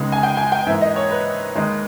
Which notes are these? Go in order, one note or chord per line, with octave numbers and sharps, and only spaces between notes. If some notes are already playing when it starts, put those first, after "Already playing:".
Already playing: C#2 C#3 G#3 B3 D#4
G#5
G5
G#5
G5
G#2 E3 A#3 E5
D#5
C#5
B4
D#2 D#3 G#3 D#4